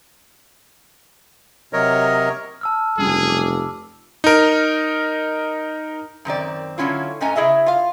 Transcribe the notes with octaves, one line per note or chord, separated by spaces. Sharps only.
C3 F#3 A#4 C#5 D#5
A5 E6 F6
F1 G2 C#3 F#3 G#4
D6
D#4 A#4
F#2 D#3 C4 D5
D3 F#3 C#4 E4 F4
G#2 A3 C#4 D#5 G#5 A#5
C#3 E4 G#4 D#5 E5
F4 F5